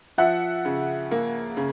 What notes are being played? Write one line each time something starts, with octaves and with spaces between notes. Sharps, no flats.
F3 E5 F#5
C#3
A#3
C#3